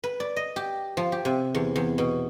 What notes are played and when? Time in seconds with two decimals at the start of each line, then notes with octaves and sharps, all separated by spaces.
0.04 B4
0.20 D5
0.36 D#5
0.56 G4
0.97 F3
1.12 G4
1.25 C3
1.55 E2
1.76 E2
1.98 B2